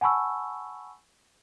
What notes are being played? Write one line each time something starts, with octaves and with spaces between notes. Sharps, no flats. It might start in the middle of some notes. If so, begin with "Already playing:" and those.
F#5 G#5 A5 B5 C#6 E6